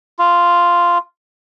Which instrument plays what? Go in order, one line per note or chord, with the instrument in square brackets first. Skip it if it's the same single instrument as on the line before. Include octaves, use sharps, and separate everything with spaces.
[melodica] F4